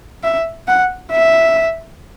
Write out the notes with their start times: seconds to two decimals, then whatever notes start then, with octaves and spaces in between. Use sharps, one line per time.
0.23 E5
0.68 F#5
1.12 E5